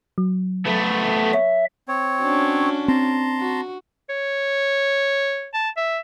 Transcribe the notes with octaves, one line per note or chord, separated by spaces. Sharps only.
F#3
A3 B3
C#5 E5
C4 C#5
C#4 D4 F#4
C4 A5 A#5 C6
F#4
C#5
A5
E5